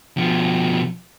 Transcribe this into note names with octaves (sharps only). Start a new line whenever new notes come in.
B2 F3